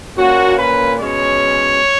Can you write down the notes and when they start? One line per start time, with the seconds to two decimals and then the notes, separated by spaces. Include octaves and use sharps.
0.17 A#2 A#3 C#4 F#4
0.58 B4
0.98 B2 G#3 C#4 C#5